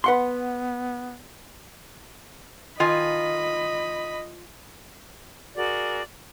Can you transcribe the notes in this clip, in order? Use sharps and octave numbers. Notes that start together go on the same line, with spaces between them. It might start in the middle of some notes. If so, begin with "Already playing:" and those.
B3 B4 F#5 C6
D#3 F4 D#5 G#5 B5
F#4 G#4 A#4 D5